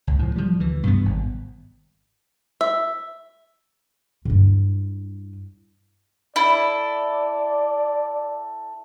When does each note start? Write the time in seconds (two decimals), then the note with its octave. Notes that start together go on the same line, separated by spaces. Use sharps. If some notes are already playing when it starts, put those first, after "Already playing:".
0.07 C#2
0.19 A2 F3
0.36 F3 G3
0.59 D2 E3
0.83 G2 C3 B3
1.05 G#1
2.61 E5
4.25 G2 E4
6.36 E4 A4 D5